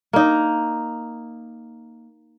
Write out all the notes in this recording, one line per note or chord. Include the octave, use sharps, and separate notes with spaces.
A#3 D#4